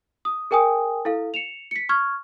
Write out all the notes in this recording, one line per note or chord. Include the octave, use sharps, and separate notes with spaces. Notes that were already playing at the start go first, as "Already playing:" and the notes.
D#6
G#4 A#4 G5 G#5 D#6
E4 A4 F5
C#7 E7 F7
B6 C#7
C#6 F6 G#6